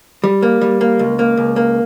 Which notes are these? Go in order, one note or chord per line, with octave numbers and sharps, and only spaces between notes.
G3
A#3
G3
A#3
C#2
A#3
C#2
A#3